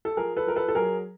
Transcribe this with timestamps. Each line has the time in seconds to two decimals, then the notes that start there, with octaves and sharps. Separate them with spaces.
0.05 A4
0.17 F3 G#4 A#4
0.37 A4 B4
0.46 F3 A#4
0.56 A4 B4
0.68 A4
0.75 F#3 G#4 A#4